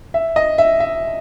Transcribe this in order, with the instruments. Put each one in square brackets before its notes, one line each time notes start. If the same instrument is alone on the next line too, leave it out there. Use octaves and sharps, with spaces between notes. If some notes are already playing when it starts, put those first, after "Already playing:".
[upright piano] E5
D#5
E5
E5